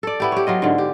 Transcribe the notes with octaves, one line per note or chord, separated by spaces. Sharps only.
A4 D5
B3 E4 G4
G4 C#5
F#3 F4 D#5
G#2 D3
G4